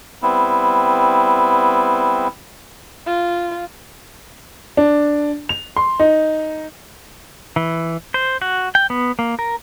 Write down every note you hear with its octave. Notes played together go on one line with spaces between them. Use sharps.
G3 B3 C4 E4
F4
D4
F7
C6
D#4
E3
C5
F#4
G5
B3
A#3
A#4